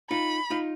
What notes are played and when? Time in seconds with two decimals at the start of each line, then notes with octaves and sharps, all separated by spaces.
0.10 D#4 F4 B5
0.50 D#4 F4